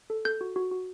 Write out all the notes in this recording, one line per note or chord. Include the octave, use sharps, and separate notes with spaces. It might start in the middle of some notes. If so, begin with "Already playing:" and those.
A4
A4 G6
F#4
F#4
F#4